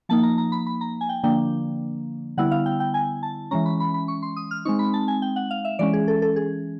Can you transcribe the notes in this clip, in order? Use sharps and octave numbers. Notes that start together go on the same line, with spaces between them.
F3 A#3 D#4 A5
A#5
A#5
B5
B5
A#5
G#5
G5
D3 F3 A#3 D4 G5
D3 G3 B3 E4 F#5
F5
G5
G5
G#5
A5
E3 G#3 C#4 A#5
B5
B5
B5
C#6
C6
D#6
F6
G#3 C4 D#4 C#6
B5
A5
G#5
G5
F#5
F5
E5
E3 G#3 C#4 D5
G#4
A4
A4
G#4